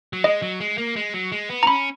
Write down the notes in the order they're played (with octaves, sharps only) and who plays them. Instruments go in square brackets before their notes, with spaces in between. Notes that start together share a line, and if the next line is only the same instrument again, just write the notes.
[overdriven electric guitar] F#3
[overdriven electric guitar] G#3 [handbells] D#5
[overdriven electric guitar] F#3
G#3
A#3
G#3
F#3
G#3
B3
[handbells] A#5
[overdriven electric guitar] C#4 [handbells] B5